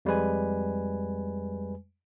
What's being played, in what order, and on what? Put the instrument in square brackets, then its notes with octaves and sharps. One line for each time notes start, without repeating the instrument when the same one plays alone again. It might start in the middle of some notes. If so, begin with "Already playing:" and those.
[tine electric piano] F2 G3 G#3 B4 G#5